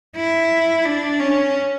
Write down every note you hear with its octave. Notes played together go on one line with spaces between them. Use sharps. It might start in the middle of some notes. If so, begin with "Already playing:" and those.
E4
D4
C#4